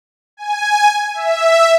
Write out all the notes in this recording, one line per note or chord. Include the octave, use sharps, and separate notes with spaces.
G#5
E5